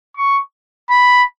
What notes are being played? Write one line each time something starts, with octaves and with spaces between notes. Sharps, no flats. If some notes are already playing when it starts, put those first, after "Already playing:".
C#6
B5